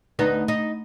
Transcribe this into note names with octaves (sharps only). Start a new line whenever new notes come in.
D2 B3 D#4
D#4